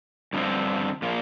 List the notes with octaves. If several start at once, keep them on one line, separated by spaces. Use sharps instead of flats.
G2 D3 F3 C4
A#2 F3 A#3